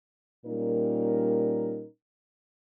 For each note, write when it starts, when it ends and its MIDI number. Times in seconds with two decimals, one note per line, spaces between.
0.46 1.85 46
0.46 1.85 55
0.46 1.85 61
0.46 1.85 63
0.46 1.85 70